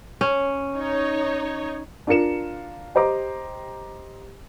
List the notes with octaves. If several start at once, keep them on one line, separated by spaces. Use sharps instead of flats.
C#4
D#4 C#5
D4 F4 A#4 C#7 E7
G4 C5 D#5 A#5 D6